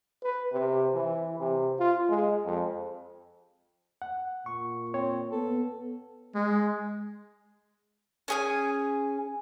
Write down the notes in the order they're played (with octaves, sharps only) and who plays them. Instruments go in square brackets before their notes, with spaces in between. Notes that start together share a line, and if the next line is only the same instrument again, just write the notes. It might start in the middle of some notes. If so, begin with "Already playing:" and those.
[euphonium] B4
C3
E3
C3
F4
G#3
F2
[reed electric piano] F#5
[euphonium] A#2 [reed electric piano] C#6
[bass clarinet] C4 [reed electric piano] C#5
[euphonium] B3 [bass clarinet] A4
[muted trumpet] G#3
[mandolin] C#4 G#4 G#5